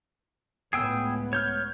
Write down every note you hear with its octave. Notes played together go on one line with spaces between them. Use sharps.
C#2 A2 B3 G#4 G5 E6
C#5 F6 G6 G#6